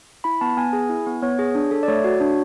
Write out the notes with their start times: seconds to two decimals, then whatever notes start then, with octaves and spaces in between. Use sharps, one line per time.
0.24 E4 B5
0.41 B3 A5
0.57 B3 G#5
0.73 G#4
0.90 E4
1.07 B3
1.23 B3 C#5
1.39 G#4
1.55 D4
1.71 A4
1.83 D5
1.88 A3 C#5
2.04 F#4
2.20 D4